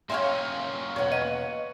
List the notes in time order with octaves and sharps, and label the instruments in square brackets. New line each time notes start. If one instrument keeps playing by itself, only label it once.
[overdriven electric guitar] A#3 C#4 [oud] C#5 D5 E5 [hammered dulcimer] F5 G5 C6
[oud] E2 B2 [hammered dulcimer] C#5 F#5
[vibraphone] D#5